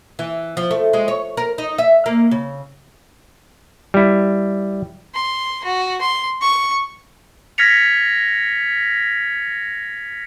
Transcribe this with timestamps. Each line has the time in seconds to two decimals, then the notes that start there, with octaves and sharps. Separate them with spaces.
0.19 E3
0.57 F3
0.71 A3
0.93 G#3
1.08 C#5
1.37 A#4
1.58 D#4
1.78 E5
2.06 A#3
2.31 C#3
3.94 G3 E4
5.14 C6
5.63 F#4
6.00 C6
6.41 C#6
7.58 F6 G#6 A#6 B6 C#7 F7